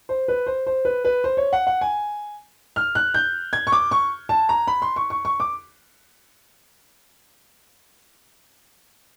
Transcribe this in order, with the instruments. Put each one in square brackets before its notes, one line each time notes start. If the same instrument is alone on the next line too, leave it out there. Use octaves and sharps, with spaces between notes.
[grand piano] C5
B4
C5
C5
B4
B4
C5
C#5
F#5
F#5
G#5
F6
F#6
G6
G#6
C#6
D6
C#6
A5
A#5
B5
C6
C#6
C#6
C#6
D6